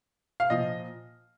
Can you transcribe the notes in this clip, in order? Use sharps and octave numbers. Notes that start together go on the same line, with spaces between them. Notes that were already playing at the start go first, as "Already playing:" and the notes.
F5
A#2 F3 D#5